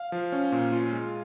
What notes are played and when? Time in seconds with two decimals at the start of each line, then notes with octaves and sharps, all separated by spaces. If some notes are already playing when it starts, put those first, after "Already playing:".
Already playing: F5
0.12 F3
0.32 C#4
0.52 A#2
0.72 F4
0.92 G#3